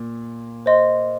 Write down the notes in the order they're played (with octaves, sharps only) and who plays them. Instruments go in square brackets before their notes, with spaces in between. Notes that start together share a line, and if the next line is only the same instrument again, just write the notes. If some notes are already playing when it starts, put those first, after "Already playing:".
Already playing: [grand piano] A#2
[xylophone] C5 D#5 C6